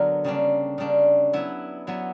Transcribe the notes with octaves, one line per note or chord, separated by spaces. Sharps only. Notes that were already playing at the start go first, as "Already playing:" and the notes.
Already playing: D3 F#3 B3 D4 A#4
C#3 G3 A#3 D4
C#3 G3 A#3 D4
F#3 B3 E4
F#3 B3 E4